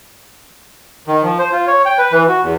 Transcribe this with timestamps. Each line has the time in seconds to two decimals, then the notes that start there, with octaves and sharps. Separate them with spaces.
1.07 D#3
1.23 F3
1.39 C5
1.52 F4
1.67 C#5
1.86 G5
1.98 B4
2.12 E3
2.29 F#4
2.43 E2